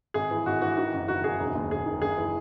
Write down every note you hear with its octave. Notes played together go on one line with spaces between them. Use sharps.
G#1 G#4
E3
G#1 F#4
E3 F#4
D#3 F#4
F#1
D#3 F#4
F#1 G#4
E1
D#2
E1 G#4
D#3
F#1 G#4
E3